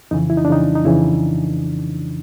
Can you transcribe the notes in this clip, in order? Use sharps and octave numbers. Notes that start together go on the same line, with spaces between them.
F2 C#3 E3 D#4
E4
D#4
D4
F2 C#3 E3 D#4
D#4
F2 C#3 E3 E4